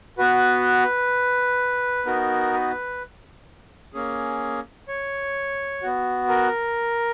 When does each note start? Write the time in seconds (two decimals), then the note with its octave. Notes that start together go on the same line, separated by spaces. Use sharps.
0.18 B3 F#4 B4
2.06 B3 D#4 F#4 A#4
2.53 B4
3.94 A#3 C#4 G#4
4.88 C#5
5.82 B3 F#4
6.29 A#4